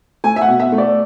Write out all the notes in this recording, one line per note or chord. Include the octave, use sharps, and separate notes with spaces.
A3 G#5
E5
F#5
B2
E5
A3
D5